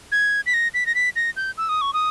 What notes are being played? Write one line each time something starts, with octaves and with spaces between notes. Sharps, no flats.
G#6
B6
A#6
B6
A#6
B6
A#6
G6
E6
D#6
C#6
D#6